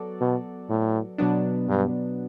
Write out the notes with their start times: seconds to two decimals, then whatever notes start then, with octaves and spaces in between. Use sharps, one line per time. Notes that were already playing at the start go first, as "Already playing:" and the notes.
Already playing: F#3 B3 F#4 A4 D5
0.21 B2
0.70 A2
1.18 B2 F#3 B3 D4
1.69 G2